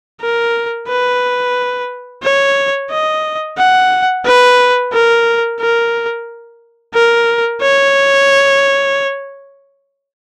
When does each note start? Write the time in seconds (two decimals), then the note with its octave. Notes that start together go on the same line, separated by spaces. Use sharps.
0.22 A#4
0.88 B4
2.23 C#5
2.91 D#5
3.58 F#5
4.25 B4
4.93 A#4
5.60 A#4
6.94 A#4
7.62 C#5